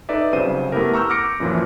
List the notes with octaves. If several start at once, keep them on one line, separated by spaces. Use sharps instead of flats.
D#4 A4 B4 D5 E5
C2 C#3 F#3 C5 D#7
A3 B3 E4 G4 A#4
A#5 C#6 E6 F6 G6
D6 G6 A#6 C#7 D7
F#2 A#2 E3 F3